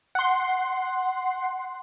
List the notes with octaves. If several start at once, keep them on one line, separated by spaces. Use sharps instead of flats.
F#5 C6